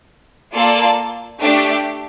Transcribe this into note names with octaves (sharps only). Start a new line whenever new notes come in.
A#3 F4 A4 D5 A5
A3 D4 G4